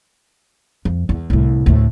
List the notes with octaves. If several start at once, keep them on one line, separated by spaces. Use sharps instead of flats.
F2
E2
C2 A2
D2 A2